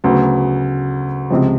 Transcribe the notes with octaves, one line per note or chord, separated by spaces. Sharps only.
D2 C#3 F#3 B3
C#2 C3 F3